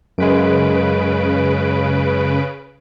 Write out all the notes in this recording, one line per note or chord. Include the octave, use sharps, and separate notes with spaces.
F#2 C#3 G#3 B4 D7